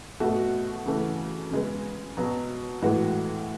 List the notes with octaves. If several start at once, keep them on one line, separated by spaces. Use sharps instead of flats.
B2 A3 F#4
C#3 E3 A3
C#3 G#3 B3
B2 F#3 B3
A2 E3 G#3 B3 F#4